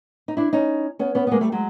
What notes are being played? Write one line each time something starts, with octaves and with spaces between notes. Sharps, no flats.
D#4
D4 E4
C#4 D#4
B3 C#4
B3 C#4
B3
G#3 A#3
G3 A3
F#3 G#3